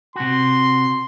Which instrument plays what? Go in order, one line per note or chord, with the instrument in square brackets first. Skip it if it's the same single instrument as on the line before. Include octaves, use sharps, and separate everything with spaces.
[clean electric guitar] C3 F#4 [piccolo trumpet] C6